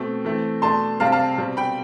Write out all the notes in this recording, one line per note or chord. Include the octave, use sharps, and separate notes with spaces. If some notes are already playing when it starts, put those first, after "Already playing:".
Already playing: B2 A3 C4
E3 A3 C4
B2 A3 D4 A5 C6
C3 G3 C4 F5 A5
F5 A5
B2 G3 C4
G5 B5